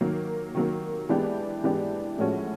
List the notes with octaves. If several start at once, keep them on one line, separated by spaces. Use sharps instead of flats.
D#3 F#3 A#3
D#3 F#3 A#3
E3 G#3 B3 D4 G4
E3 G#3 B3 D4 G4
A2 F3 G#3 C#4 F#4